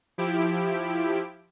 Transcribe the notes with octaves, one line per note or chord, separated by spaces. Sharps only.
F3 E4 G4 D7